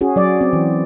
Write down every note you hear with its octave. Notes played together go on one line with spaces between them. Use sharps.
C#4 F#4 G#4
F#3 D5
C4
E3